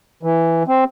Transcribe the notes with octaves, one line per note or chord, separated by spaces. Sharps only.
E3
C4